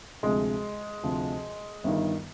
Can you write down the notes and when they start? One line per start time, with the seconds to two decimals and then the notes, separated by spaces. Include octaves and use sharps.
0.23 D2 C3 F3 G#3
1.03 D2 C3 F3
1.84 G1 G2 D#3